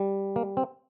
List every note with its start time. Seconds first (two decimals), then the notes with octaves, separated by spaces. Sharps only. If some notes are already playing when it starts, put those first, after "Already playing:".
Already playing: G3
0.36 A#3
0.57 C4